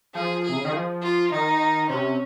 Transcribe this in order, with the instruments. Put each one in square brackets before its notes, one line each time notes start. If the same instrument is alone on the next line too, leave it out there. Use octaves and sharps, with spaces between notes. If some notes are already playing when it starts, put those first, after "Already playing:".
[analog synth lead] F3 [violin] G#4
[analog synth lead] C3 [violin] G#4
[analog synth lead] C#3
D#3
F3
[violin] F4
[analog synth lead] D#3 [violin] D#4
[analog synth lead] C3 [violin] C#4